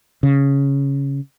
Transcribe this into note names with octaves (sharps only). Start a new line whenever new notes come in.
C#3